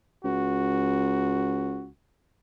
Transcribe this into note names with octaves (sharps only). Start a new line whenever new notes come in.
C#2 F#4